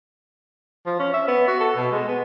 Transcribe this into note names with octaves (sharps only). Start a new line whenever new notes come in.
F3
C#4
E5
B3
F#4
A4
B2
G#3
B3